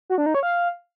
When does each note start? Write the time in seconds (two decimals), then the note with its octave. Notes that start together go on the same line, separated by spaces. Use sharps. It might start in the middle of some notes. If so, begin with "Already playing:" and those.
0.10 F#4
0.18 D4
0.26 D#4
0.34 C#5
0.43 F5